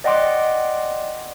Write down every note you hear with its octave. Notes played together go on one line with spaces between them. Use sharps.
D5 D#5 F#5 G5 C6 D6